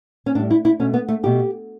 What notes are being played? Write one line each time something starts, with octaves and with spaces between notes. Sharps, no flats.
C#4
A2 G3 D4
E4
E4
B2 A3 C#4
B3
A3
B2 A3 G4